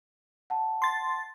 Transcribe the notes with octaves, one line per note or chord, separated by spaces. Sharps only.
F#5 A5
C6 A6